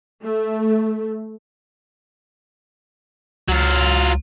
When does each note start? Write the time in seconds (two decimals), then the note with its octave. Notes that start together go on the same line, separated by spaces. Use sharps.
0.24 A3
3.48 C#2 F#3 F4